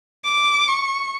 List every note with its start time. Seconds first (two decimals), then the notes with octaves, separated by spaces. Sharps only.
0.24 D6
0.68 C#6